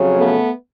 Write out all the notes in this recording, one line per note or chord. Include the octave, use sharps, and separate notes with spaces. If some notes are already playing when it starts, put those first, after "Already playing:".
Already playing: F2 C#3 F#3
A3 B3